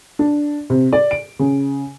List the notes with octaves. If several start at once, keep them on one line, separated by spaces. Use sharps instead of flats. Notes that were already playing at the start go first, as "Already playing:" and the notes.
D4
C3
D5
D7
C#3